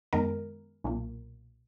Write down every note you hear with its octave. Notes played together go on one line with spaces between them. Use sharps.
F#2 D#3 G#3 B3 A#4
B1 A#2 A#3